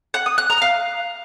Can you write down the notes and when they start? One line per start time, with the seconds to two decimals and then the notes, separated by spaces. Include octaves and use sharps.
0.14 F#5
0.26 D#6
0.38 F#6
0.50 A#5
0.62 F5